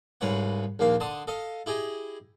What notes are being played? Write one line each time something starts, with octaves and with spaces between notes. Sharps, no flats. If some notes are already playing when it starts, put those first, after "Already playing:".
C2 G#2 C#3 B4 C#5 F#5
A#1 D#2 A#3 F5
D3 A5 C6 D#6
A4 D#5 F5
E4 G4 G#4 D#5